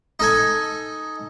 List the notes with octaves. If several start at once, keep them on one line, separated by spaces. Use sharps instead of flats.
D#4 A4 G#5